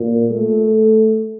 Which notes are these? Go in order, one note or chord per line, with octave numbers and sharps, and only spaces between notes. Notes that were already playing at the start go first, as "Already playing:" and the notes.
Already playing: A#2
A3